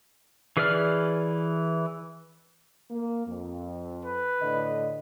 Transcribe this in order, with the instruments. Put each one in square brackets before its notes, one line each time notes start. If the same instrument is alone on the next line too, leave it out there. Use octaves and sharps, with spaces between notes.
[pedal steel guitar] E3 G#4 B4 D5 F6
[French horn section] A#3
F2
[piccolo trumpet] B4
[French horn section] A2 D3 D#5